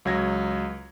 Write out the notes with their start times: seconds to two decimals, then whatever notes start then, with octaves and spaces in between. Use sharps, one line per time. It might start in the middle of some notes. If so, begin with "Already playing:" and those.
0.05 C#2 F#3 G#6 A#6